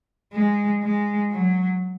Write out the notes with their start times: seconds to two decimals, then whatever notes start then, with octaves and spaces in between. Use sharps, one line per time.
0.33 G#3
0.83 G#3
1.32 F#3